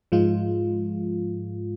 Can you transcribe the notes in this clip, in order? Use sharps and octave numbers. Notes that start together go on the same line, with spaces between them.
G#2 F3 G#3 F4